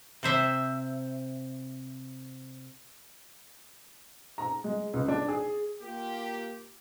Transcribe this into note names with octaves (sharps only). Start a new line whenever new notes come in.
C3 C5 E5
A#5
G#3
C#2
D4
G#4
A#3 F4 G4